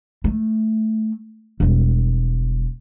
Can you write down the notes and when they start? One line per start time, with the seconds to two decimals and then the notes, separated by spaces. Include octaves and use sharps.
0.24 A3
1.60 E1 G3